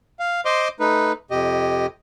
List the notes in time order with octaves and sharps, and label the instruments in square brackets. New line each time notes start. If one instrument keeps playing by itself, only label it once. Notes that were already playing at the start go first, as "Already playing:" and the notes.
[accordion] F5
C5 D#5 C6 D6
A3 D#4 B4
F2 C3 G4 D#5